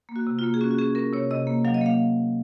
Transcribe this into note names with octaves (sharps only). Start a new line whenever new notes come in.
A#3
F#4
C3
A#3 F4
G#4
C#4 F#4
F#4
C#4 G#4
C#4 A#4
C3 C#5
C3 D#5
A#3
F#3 F5
D#5
A#3 F5